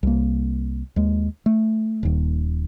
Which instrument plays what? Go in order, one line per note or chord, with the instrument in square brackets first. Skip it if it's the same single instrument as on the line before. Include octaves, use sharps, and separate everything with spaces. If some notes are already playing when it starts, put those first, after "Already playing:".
[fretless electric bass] C2 A#3
D#2 G#3
A3
D#1 D#2